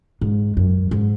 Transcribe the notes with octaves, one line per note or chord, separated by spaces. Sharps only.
G#2
F#2
G#2